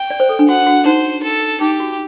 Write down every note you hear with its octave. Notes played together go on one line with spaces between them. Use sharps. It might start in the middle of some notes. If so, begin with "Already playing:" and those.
Already playing: G5
D5
C5
A4
D4
F#4 F#5
F#4
D#4 C5
A4
D#4 G4
F#4